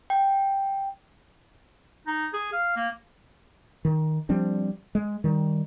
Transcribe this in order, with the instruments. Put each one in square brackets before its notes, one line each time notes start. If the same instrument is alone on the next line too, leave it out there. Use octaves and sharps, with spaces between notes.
[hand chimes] G5
[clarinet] D#4
G#4
F5
A#3
[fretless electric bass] D#3
F3 G3 C4 D4
G#3
D#3 G3